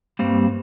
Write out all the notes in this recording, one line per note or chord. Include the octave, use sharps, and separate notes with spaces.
G2 G3 A#3 C4